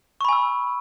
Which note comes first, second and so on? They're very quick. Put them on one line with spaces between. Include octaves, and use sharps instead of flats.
C#6 B5 G#5 E6